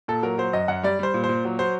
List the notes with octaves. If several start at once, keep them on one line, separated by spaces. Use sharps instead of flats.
A#2 A4
F#3 A#4
F#3 C5
F#2 D#5
F#2 F#5
G3 D5
G3 C5
A#2
C5
A#2
F#3
F#3 C5